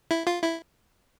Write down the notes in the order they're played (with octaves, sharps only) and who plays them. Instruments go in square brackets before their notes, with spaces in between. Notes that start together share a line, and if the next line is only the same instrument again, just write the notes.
[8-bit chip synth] E4
F4
E4